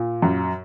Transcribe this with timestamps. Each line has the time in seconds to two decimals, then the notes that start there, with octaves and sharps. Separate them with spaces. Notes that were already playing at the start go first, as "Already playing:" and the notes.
Already playing: A#2
0.22 F#2